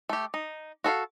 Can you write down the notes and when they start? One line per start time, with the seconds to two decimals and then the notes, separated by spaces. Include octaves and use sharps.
0.09 A3 G4
0.34 D#4
0.84 F#4 A4 B4 F5